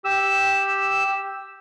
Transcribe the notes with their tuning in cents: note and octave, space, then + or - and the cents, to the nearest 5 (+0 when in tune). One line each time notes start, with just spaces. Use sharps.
G4 +0 E6 +0